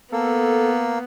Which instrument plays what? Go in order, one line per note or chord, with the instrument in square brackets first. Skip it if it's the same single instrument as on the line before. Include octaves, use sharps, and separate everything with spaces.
[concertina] A#3 [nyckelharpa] B3 [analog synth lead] A4